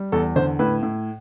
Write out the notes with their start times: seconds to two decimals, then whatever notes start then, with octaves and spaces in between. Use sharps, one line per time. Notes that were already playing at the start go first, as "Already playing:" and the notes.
Already playing: G3
0.12 E2 A4
0.36 D3 C5
0.59 A2 B4
0.83 A2